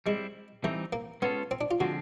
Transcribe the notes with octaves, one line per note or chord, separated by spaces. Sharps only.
G3 G#3 C4 E4
E3 G3 A3 C4 D#4
A#3
G#3 B3 C#4 F4 A4
C4
D4
F4
D3 F3 G#3 C4 F#4